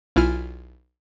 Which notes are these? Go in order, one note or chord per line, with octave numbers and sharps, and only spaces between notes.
B1 E4 F4 G#5 F6